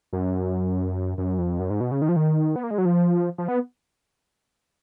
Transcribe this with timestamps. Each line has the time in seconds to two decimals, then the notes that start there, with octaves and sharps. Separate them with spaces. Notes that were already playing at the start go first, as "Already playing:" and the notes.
0.13 F#2
1.18 F#2
1.38 F2
1.60 F#2
1.70 G#2
1.80 B2
1.91 C#3
2.02 D#3
2.09 F3
2.16 D#3
2.56 B3
2.63 A#3
2.71 G#3
2.78 F#3
2.85 F3
3.38 F3
3.48 B3